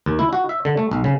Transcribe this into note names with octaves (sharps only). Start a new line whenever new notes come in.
D#2
E4
F#4
E5
D3
A3
B1
C#3